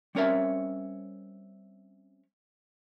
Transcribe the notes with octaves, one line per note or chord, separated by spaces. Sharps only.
G3 C4 C#4 A#4 C#5 E5